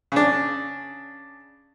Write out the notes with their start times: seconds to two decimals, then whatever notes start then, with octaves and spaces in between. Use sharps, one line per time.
0.12 C#3 D4